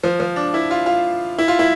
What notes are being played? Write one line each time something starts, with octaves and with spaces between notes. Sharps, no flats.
F3
F3
D4
E4
F4
F4
E4
F4
E4